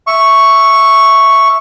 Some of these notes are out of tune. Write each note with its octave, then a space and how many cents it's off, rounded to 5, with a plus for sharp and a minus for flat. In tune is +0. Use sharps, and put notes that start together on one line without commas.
E5 +0 C#6 +0